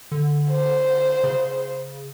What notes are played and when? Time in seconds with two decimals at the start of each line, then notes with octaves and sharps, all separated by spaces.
0.12 D3
0.51 C5
1.24 C#3